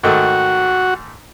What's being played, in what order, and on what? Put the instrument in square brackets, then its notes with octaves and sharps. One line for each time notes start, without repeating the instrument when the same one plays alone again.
[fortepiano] G#2 D#3 A3 [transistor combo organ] F#4